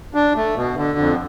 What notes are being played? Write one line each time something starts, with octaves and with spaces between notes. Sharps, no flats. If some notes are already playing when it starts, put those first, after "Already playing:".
D4
A3
B2
D3
F2